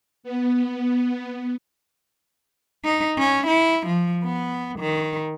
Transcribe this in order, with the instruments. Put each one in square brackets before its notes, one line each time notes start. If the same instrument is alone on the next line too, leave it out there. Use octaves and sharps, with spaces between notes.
[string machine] B3
[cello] D#4
C#4
E4
F3
B3
D#3